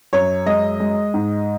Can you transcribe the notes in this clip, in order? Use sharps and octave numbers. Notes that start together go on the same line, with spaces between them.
F#2 C#5
G#3 D#5
G#3
G#2